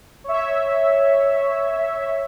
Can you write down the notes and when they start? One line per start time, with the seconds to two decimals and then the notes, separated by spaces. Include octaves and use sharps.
0.24 C#5 E5